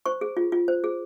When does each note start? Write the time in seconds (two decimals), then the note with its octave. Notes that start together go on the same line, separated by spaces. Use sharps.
0.06 C5 C#6
0.21 G#4
0.37 F4
0.52 F4
0.68 C5
0.84 G#4